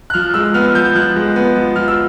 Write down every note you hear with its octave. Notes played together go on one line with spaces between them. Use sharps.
F#6
F3 F6
G#3 E6
B3 F6
F3 G6
F3 F#6
G#3
B3
F3
F3 F6
E6